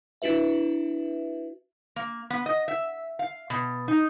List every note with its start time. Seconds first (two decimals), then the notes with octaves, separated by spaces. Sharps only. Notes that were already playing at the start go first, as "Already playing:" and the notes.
0.22 D4 E4 F#4 B4 E5
1.96 A#3
2.30 B3
2.46 D#5
2.68 E5
3.19 F5
3.50 B2
3.88 D#4